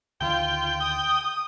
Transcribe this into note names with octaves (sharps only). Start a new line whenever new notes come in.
D2 D3 D#3 F4 G5
D#6